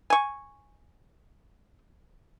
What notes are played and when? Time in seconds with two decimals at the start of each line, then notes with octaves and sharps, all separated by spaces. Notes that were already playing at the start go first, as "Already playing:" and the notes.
0.10 G#5 C#6